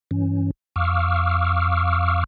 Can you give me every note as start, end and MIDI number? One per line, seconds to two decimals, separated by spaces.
0.11 0.51 43
0.11 0.51 52
0.11 0.51 61
0.76 2.24 41
0.76 2.24 77
0.76 2.24 85
0.76 2.24 86
0.76 2.24 88
0.76 2.24 89